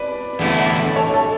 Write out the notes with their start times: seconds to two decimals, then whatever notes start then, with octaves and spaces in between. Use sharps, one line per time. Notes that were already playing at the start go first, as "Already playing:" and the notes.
Already playing: B4 D5
0.39 E2 D3 A3 E4
0.96 A4 C#5
1.14 A4